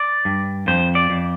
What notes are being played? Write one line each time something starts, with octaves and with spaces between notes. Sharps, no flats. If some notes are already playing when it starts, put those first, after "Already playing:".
Already playing: D5
G2
F2 C5
D5
F2